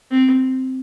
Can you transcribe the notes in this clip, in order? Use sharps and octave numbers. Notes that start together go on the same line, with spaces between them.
C4